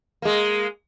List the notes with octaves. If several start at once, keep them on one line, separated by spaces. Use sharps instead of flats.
G#3 A#3